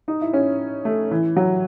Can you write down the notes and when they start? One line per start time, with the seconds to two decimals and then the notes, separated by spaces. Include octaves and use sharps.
0.08 D#4
0.21 E4
0.33 C#4
0.85 A3
1.11 E3
1.37 F#3